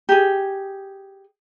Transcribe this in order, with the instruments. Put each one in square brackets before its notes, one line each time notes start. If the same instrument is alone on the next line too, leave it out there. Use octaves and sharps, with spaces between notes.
[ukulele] G4 G#4